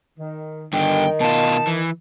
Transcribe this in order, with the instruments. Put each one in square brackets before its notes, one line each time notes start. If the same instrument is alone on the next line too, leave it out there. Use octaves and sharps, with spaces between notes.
[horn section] D#3
[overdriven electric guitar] G2 D3 [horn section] D#3 [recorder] G5
[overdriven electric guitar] B2 F4 [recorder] A5
[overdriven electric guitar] E3